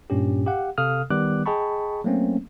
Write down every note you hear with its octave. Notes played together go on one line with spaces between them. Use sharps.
G2 A#2 C#4 G4
G4 F5 F#5
C3 A4 F5 D#6 F6
D#3 G3 B3 D6 F#6
G#4 D#5 G5 A5 B5 C#6
F#3 A3 A#3 C4 C#4